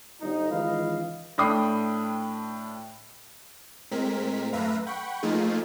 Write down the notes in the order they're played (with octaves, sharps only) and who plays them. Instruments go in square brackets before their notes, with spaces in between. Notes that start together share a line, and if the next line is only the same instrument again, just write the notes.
[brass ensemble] G1 D#4
C#2 D#3 E3 B4 D#5 F5
[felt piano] A2 D4 G5 B5 D#6 C7
[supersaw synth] A2 G#3 C4 A#4 B6
F#2 A3 B4 E5 F5 A#5
F#5 G5 B5 C#6
F3 A3 A#3 D#4 F4 G#4